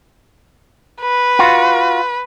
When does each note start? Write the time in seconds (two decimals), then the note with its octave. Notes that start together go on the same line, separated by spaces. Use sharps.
1.02 B4
1.39 F4 F#4